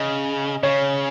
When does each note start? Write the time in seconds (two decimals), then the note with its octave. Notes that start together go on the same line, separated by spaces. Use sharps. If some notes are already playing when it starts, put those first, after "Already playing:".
Already playing: C#3 D#5
0.63 C#3 C#5